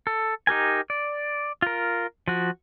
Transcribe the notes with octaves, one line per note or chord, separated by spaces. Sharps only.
A4
D#4 G4 A#4 G#5
D5
F4 A#4
F3 F#4